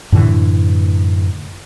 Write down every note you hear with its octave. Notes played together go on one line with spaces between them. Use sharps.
F#2 A2 D3 E3